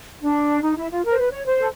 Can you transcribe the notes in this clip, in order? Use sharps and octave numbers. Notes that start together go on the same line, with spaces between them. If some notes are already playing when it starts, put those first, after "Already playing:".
D4
D#4
E4
F4
A#4
C5
B4
C#5
C5
A4